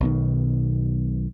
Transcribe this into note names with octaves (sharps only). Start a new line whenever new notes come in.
B1 B2 D#3